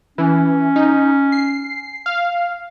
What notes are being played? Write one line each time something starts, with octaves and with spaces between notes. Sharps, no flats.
E3 C#4
D#4
C7
F5